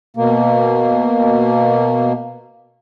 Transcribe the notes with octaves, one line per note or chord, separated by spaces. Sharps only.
B2 A#3